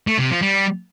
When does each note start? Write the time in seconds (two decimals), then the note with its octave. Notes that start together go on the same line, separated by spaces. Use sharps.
0.07 A3
0.19 C3
0.30 F3
0.42 G3